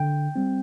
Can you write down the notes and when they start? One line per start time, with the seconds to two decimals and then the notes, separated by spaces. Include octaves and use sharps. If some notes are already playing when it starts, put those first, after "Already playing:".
Already playing: D3 G5
0.36 G3 C4